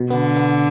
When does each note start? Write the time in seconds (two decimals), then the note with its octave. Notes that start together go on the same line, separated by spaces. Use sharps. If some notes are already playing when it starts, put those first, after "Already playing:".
Already playing: B2
0.10 D3 B3
0.36 B3